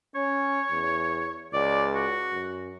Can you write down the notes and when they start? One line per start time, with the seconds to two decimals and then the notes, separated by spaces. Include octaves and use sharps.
0.15 C#4 C#5
0.71 E2
1.53 C#2 D5
1.95 F#4
2.32 F#2